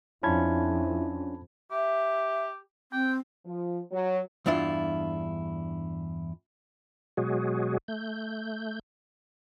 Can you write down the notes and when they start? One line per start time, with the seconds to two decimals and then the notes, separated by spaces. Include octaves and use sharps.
0.23 F2 C#4 D4 E4 F4 A5 B5 G#6
1.71 G4 E5
2.92 C4 G5
3.45 F3
3.91 F#3
4.46 E2 G2 D4 E4 F4
7.17 B2 F#3 G#3 F#4 G#4
7.88 A3 G6